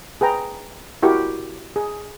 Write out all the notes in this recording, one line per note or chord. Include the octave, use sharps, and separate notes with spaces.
G#4 B4 G5 A#5
E4 F#4 G4 A#4 C#6
G#4